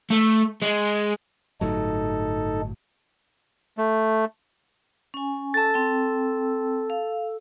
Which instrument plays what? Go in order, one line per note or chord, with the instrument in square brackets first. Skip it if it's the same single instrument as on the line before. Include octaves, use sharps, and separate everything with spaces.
[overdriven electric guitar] A3
G#3
[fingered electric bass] G1 A2 F#3 [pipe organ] D#4 A4
[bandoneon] A3
[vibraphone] C#4 G#5
[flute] A4 [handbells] A5 A6
[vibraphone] C4 G5
F5